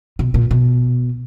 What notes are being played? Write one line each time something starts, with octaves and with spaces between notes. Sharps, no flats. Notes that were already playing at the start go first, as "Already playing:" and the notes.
B2
A#2
B2